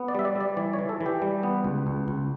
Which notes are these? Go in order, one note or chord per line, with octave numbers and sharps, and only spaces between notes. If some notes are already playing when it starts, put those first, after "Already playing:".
Already playing: B3
D5
G3 E5
D5
G3 D5
E3 D5
C#5
E3
A4
E3
G4
G3
B3
C#2
C#2
C#2